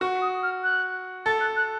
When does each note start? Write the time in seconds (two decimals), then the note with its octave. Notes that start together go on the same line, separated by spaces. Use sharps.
0.01 F#4 C#6
0.22 D#6
0.43 F6
0.63 F#6
1.26 A4 A6
1.41 F#6
1.56 F#6